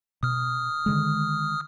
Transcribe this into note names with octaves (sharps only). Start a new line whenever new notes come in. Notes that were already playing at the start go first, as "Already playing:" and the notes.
B2 D#6 F6
D3 D#3 G#3